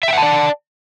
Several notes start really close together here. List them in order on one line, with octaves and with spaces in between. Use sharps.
E5 G5 F#5 A5 D5